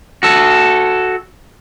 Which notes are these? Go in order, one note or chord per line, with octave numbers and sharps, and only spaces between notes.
F#4 A4